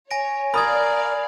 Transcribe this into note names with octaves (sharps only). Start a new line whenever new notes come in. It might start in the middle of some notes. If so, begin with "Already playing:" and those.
C#5 G#5 A#6 D7
A#4 D5 F5 B5 D#6 G#6 A6